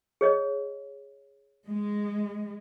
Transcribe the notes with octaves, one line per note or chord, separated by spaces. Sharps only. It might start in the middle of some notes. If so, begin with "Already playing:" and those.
G#4 C#5 D#5
G#3